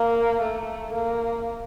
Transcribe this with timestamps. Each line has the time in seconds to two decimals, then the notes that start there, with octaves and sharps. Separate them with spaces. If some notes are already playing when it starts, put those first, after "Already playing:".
Already playing: A#3
0.41 A3
0.93 A#3